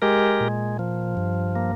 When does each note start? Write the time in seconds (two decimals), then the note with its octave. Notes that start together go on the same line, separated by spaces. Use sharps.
0.02 G#3 G4 A#4
0.40 A#2
0.79 F3
1.17 G2
1.56 A#3